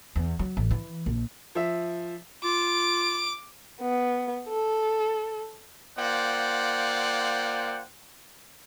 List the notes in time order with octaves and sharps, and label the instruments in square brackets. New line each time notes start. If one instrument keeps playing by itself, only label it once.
[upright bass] E2
F#3
A1
E3
A#1
[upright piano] F3 E5
[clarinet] F4 [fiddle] D6
[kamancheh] B3
A4
[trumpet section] A#3 F4 C5 D5 F#5 G5